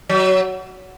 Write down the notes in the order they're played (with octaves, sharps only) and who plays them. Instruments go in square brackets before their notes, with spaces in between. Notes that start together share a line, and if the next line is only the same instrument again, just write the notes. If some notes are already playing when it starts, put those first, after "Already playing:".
[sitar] F#3